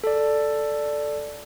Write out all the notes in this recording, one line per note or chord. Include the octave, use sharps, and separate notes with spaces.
A4 D5